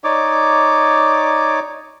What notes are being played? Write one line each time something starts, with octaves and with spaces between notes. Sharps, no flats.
D#4 C#5 D5 D6